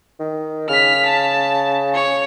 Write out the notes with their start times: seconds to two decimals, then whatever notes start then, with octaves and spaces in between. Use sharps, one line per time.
0.20 D#3
0.69 C#3 F6 B6
1.06 A5
1.94 C#5